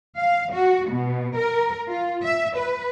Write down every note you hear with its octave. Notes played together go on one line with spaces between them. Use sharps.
F5
F#4
B2
A#4
F4
E5
B4